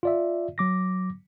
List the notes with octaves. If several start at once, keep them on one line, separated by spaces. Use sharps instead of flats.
F4 D5 E5
F#3 D6 A#6